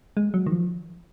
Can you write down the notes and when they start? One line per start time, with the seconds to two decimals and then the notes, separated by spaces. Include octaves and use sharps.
0.17 G#3
0.34 F#3
0.46 D#3
0.52 F3